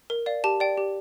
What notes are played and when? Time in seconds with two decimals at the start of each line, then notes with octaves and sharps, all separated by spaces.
0.10 A#4
0.26 D5 F5
0.44 G4 A5
0.60 D5 G5
0.78 G4